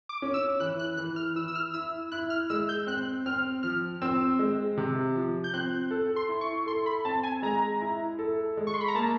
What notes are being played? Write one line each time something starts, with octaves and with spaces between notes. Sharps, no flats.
D6
C#4
E6
E3 F#6
F#6
E3 F#6
F6
E3 E6
E6
F6
E4 E6
E4 F#6
F6
G#3 E6
G6
C4 F#6
C4 F6
F3 F6
C4 E6
G#3
C3
F3
G6
C4 F#6
A4
C6
E4
C#6
A4 C6
B5
C4 A5
G#5
G#3 A#5
E4
A4
G#3
C#6
C6
B5
A#5
A#3 A5